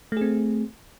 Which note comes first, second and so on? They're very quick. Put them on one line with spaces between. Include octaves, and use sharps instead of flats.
A3 G#4 C4